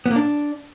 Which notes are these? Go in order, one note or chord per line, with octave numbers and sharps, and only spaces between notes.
B3
A#3
D4